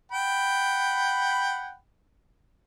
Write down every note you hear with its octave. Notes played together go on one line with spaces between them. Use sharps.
F#5 G5 B5